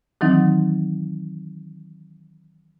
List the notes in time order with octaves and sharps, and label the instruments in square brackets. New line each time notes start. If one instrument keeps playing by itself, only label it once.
[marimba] D#3 E3 F#3 C4 D#4